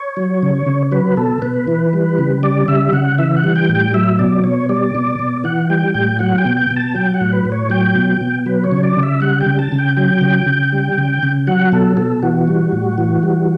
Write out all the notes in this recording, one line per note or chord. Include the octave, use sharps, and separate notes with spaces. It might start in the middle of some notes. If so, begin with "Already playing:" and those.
Already playing: C#5
F#3
C#3
C#3
F#3 B4
B2 A4
B2 B4
E3
G3
C#3
G3 D5
C#3 E5
C#3 F#5
E3 E5
F#5
G3
G5
A2
G5
F#3 E5
B2 D5
B2 C#5
G3 D5
B2
B2
E3 F#5
G3 G5
A2 G5
F#3 F#5
G5
B2
G5
B2
A5
F#3 G5
F#5
A2
B4
A2
C#5
F#3 G5
B2
B2
F#3 B4
C#5
C#3
D5
C#3
E5
G3 F#5
G5
C#3
A5
C#3
G5
F#3 G5
C#3
C#3
G3
C#3
C#3
F#3 F#5
B2 A4
B2 A4
E3 F#4
G3
A2
E3
G3